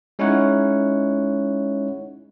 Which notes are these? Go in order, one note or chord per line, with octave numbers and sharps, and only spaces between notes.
G#3 C#4 D#4 E4 C#5 F#5